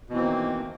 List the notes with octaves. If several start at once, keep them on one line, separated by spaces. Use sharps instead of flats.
B2 D#3 E3 A#3 C4